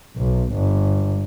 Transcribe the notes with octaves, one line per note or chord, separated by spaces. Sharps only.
B1
G1